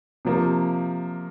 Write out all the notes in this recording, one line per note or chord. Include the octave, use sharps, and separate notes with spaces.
C3 F3 A#3